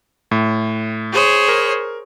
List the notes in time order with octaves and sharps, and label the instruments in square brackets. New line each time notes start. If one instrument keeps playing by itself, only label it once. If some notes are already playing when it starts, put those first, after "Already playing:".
[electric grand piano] A2
[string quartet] G#4 C5 C#5
[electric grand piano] A#4